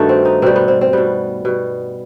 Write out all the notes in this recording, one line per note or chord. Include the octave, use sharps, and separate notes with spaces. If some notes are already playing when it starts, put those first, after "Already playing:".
Already playing: G2 D#3 A3 F#4 A4
C4
D#4
B2 G3 C4
B3
C4
C4
B2 G3 B3
B2 G3